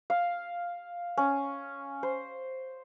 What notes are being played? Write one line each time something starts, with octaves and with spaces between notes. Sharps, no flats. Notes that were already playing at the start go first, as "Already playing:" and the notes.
F5
C#4
C5